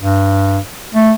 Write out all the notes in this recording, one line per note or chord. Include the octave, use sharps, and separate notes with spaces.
G2
A3